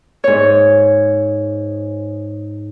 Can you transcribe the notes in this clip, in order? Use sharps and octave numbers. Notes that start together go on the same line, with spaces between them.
G#2 C#5